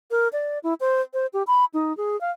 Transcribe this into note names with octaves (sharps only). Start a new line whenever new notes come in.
A#4
D5
E4
C5
C5
G4
B5
D#4
G#4
F5